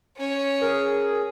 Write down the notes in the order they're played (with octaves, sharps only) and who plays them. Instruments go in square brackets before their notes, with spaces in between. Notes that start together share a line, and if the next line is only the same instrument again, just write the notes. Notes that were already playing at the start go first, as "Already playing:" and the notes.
[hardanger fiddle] C#4 C#5
[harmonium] G#4 [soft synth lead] A#4